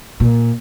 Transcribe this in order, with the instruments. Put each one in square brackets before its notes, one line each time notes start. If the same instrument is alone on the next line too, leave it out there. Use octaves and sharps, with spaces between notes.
[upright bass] A#2